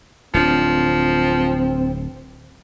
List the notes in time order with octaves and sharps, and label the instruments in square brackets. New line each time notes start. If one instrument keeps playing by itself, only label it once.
[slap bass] D1 D4 [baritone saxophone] F3 [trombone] C4